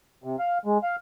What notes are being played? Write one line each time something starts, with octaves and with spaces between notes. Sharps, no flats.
C3
F5
G#3
F5